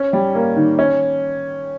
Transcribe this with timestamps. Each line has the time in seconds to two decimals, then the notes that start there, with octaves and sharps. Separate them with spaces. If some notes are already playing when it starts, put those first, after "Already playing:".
Already playing: C#4
0.13 G3
0.35 A#3
0.56 D#3
0.79 C#4